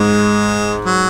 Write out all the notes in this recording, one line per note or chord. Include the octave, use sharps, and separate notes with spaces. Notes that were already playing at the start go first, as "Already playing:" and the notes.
Already playing: G#2 G#3
F#3